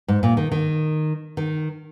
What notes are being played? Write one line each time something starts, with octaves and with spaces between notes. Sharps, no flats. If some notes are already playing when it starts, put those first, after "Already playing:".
G#2
A#2
D#3
D#3
D#3